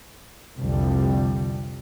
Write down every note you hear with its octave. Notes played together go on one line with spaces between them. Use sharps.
C2 F2 D3 G3